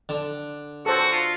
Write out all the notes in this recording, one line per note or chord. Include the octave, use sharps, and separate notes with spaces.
D3
F#4 A4 C5
F4